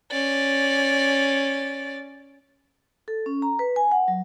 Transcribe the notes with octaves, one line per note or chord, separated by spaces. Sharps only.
C#4 D5
A4
C#4
A#5
B4
G#5
F#5
F#3